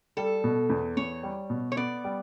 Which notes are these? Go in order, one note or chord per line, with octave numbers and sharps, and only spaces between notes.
G3 A4
B2
E2
E2 C#5
G3
B2
C#5
B3 D5
G3